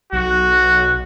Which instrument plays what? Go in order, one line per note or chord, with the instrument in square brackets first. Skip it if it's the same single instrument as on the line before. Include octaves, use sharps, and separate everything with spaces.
[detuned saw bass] B1 [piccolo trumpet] F#4